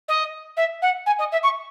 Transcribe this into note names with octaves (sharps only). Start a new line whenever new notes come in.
D#5
E5
F#5
G#5
D#5
E5
C#6